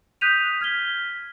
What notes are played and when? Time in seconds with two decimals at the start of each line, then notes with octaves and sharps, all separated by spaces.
0.21 D#6 F#6 G6 B6 D#7 F7
0.61 F6 G#6 B6 G7